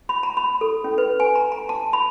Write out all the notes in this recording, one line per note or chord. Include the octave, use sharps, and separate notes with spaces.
B5
A#5
B5
A4
C#4
B4
G#5
A#5
A#5
A5
B5